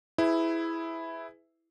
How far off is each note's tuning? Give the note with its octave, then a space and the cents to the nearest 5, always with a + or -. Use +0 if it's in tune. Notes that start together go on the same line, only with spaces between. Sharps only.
E4 +0 G#4 +5 B4 +30